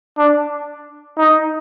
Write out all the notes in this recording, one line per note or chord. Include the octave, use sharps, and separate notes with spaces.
D4
D#4